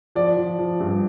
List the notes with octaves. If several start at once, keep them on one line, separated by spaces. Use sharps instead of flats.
F3 D5
F3
F3
G2